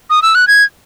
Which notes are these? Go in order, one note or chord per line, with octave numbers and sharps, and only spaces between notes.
D#6
E6
F#6
G#6